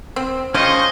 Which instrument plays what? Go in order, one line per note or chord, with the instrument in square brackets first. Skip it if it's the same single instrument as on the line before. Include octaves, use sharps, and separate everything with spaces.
[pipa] C4
[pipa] F3 G#3 F4 [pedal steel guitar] C#4 C5 G5 [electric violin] D#5 C#6